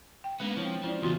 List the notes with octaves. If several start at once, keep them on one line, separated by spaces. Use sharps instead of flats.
G5
G#3 A#3 B3 C#4 D4
F3 C4 E4 C#5
F3 C#4 E4 D5
E2 C#3 F4 F#4